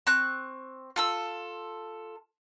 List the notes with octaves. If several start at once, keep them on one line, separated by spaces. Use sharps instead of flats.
C4 C#6 F#6
F4 A4 E6